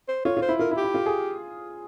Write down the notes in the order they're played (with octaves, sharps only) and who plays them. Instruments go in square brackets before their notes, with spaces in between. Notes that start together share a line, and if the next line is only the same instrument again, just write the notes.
[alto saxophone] C5
[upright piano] F4 [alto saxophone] C#5
[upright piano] F4
[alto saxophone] C5
[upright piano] E4
[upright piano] F4 [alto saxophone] A#4
[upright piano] E4
[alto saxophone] G4
[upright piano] E4
F4
G#4